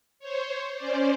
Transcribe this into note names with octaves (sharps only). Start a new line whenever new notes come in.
C5 C#5
C#4 C5 D5